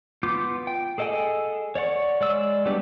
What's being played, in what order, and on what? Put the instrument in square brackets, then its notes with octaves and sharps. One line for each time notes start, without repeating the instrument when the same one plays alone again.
[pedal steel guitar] B3 F4 D6 G6
G5
G#4 A4 D#5 F#5 G#5
C#5 D5 F#5 C#6
G#3 D5 E6
F#3 G3 B3 D4 G4